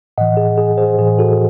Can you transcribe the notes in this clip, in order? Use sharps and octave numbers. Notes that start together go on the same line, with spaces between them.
A2 E3 D#5 F#5
G#4
G#4
G#4 C5
A2 E3 G#4
F#4 A4